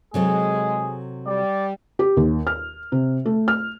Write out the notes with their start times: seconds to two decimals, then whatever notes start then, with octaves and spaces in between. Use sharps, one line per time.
0.14 C3 F#3 G#3 G#4 A4
1.27 G3 D5
1.99 G4
2.17 D#2
2.47 F6
2.92 C3
3.26 A3
3.48 F6